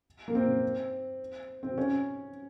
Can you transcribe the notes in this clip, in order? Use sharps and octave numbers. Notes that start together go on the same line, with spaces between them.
A#3
C4
C4
C#4